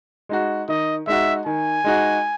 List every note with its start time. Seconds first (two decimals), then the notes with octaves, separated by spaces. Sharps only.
0.29 G#3 D#4 F#4
0.68 D#3 D#5
1.07 G#3 D#4 F#4 E5
1.46 D#3 G#5
1.84 G#3 D#4 F#4